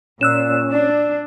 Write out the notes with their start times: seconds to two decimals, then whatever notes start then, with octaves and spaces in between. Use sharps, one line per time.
0.21 A#2 C#4 D5 E6 F#6 E7
0.70 D4 D5